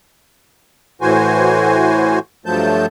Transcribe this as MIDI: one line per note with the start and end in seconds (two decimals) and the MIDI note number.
1.01 2.19 45
1.01 2.19 52
1.01 2.19 66
1.01 2.19 72
1.01 2.19 80
2.46 2.86 43
2.46 2.86 53
2.46 2.86 54
2.46 2.86 57
2.46 2.86 81
2.46 2.86 91